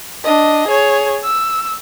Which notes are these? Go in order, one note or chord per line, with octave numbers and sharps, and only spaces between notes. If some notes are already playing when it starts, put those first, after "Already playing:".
D4 D#5
G#4 C#5
E6